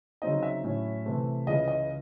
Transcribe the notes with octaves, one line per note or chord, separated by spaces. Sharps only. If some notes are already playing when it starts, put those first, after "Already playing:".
C#3 F#3 C4 D#4 D#5
E5
A2 F#3 C#4 E4
C3 E3 A3 C4
C#2 C#3 E3 D#5
D#5